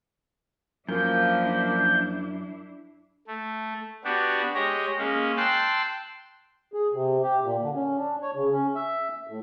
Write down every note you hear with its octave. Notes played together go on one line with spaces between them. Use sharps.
F#2 F3 A#3 D4 E4 G6
A3
B3 D4 F#4 G4
G#3 G4 C#5 A#6
G#3 A#3 C#4
G5 A5 C6 E6 F#6
G#4
C3
G4
A#2
D3
C#4
D4
C#5
C#3
C#4
E5
A2